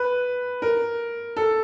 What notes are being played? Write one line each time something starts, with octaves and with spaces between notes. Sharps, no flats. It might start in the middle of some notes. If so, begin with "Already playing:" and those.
Already playing: B4
A#4
A4